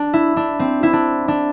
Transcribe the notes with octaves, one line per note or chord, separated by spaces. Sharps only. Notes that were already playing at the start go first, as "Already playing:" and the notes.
Already playing: D4
E4
D4
C4
E4
D4
D4